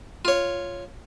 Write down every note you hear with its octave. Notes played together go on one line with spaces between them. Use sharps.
F4 C#5